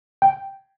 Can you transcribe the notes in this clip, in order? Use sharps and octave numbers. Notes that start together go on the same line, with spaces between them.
G5